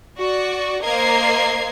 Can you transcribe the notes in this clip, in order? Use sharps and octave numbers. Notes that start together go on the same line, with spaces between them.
F#4 D5 C#6
A#3 A#4 C5 D#5 G#6 C7